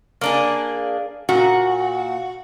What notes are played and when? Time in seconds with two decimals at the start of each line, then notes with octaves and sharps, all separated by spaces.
0.21 A#3 D4 G#4
1.29 A#2 F#4